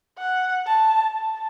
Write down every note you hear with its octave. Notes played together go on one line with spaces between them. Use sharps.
F#5
A5
A5